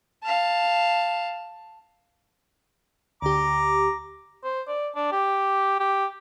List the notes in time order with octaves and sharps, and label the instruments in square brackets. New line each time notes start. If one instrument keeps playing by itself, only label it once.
[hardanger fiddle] F5 A5
[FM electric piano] D2 D3 G4 [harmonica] A#5 D6
[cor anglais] C5
D5
D4
G4
G4